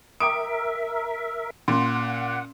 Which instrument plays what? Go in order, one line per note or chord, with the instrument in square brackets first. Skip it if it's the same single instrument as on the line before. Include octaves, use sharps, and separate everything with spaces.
[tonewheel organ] A#4 E5 [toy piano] G5 D6 D#6 [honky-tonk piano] D7
[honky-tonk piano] A#2 [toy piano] C#4 C6 [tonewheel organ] F#5